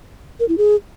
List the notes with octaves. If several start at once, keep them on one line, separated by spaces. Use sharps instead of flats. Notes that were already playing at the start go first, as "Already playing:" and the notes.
A#4
E4
G#4